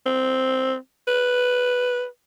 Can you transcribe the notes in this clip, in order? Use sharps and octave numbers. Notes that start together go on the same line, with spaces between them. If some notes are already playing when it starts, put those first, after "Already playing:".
C4
B4